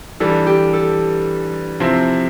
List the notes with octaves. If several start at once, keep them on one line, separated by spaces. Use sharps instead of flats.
E3 G3 D4 A4
G4
A4
C3 F3 C4 E4